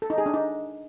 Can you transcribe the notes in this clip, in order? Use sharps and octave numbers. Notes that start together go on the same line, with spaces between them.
A4
D#4
G#4
D4
D#4